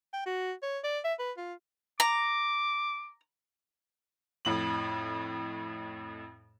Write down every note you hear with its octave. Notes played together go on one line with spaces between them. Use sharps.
G5
F#4
C#5
D5
E5
B4
F4
A#5 D6
F2 A2 F#7